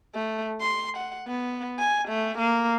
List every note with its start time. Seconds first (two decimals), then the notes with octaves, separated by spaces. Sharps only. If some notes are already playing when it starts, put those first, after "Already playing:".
0.15 A3
0.60 C6
0.97 F#5
1.28 B3
1.79 G#5
2.08 A3
2.38 A#3